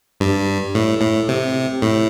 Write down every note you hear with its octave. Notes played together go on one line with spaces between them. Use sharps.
G2
A2
A2
C3
A2